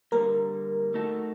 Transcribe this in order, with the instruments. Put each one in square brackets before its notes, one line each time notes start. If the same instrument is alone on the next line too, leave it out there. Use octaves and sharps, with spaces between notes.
[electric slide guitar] D3 G3 A#3 [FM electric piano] A#4
[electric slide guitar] A3 D#4 F#4 A4